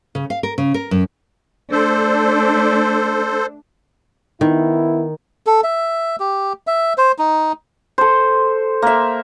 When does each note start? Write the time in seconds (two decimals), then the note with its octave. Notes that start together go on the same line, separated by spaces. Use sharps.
0.15 C#3
0.30 F5
0.43 A#4
0.58 C#3
0.74 A#4
0.91 F#2
1.72 A3 D4 A4 C5
4.41 D#3 B3 E4
5.46 A4
5.64 E5
6.20 G4
6.67 E5
6.98 C5
7.18 D#4
7.98 A4 C5
8.82 A#3 E5